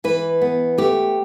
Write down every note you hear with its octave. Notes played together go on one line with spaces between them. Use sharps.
E3 B4
B3
A3 G4